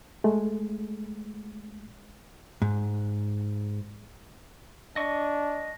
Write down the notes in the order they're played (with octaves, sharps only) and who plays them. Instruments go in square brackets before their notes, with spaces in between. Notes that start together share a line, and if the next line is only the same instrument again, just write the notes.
[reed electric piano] G#3 A3
[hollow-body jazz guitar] G#2
[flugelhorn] D4 [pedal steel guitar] D#5 C#6